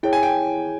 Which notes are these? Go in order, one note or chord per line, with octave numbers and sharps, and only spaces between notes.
E4 G#4 C#5 G5
G#5
G5